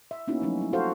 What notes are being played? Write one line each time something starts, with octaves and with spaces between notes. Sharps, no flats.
E5
A#3 B3 C#4 D#4 E4 F#4
F3 F#3 A3 C#4 D#4
G3 E4
F4 F#4 A4 C5 F5